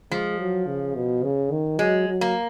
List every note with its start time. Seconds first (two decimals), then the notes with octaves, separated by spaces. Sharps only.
0.11 F3 G#3
0.39 F#3
0.67 C#3
0.95 B2
1.23 C#3
1.51 D#3
1.79 F#3 G#3
2.08 F#3
2.21 A#3